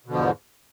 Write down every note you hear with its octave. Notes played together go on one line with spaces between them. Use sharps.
E2 G#2 B2 D3 F3